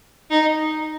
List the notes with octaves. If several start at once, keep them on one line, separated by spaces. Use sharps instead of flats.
D#4